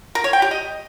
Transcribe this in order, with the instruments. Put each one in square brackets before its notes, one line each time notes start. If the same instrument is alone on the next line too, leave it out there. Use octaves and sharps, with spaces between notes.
[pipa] A#4
C#5
G5
G4
D#5